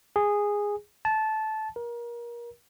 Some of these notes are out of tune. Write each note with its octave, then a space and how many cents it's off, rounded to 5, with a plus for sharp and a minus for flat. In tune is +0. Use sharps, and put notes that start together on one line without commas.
G#4 -10
A5 -15
A#4 +30